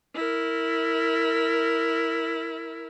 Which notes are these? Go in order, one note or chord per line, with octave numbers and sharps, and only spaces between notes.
E4 A#4